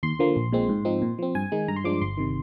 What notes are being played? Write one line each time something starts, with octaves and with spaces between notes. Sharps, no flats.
D#2 C6
D3 F3 A#3
A#1
A#2 G#3 C4
G#2
F3 C4 D#4
A#2
F3 C4
G2 G#5
D#3 G#3 D#4
G2 A#5
C6
F3 G#3 D4 D6
G1 C6
C3 D#3